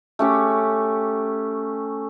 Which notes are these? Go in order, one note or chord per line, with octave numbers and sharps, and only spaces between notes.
A3 C#4 G4